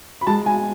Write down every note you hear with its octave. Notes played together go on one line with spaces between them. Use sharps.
B5
G#3 A5
G#5